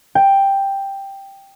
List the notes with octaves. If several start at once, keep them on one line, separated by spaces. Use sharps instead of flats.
G5